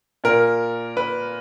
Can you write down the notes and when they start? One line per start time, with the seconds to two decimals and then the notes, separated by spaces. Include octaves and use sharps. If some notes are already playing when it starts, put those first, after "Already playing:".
0.24 A#2 A#4
0.97 B4